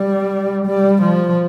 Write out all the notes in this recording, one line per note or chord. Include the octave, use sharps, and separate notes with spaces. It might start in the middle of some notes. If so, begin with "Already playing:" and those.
Already playing: G3
G3
F3